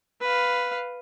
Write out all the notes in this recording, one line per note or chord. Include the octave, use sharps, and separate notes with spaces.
B4 F5